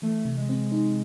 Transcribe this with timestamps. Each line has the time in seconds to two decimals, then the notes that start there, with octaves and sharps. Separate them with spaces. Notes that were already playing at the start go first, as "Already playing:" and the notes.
0.02 E3 A3
0.25 C3
0.37 G#3
0.49 C4
0.72 D#4